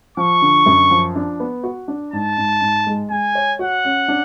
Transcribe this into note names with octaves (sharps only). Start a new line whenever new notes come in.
F3 C#6
D3
F#2
F3
D4
B3
F#4
D4
G#2 A5
G#2
G#2
G#3
G#3 G#5
C#5
F#4 F#5
C#4
D4